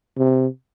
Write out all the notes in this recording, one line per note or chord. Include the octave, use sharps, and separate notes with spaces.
C3